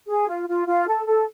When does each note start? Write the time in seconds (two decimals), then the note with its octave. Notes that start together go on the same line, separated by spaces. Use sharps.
0.09 G#4
0.28 F4
0.48 F4
0.67 F4
0.87 A4
1.07 A4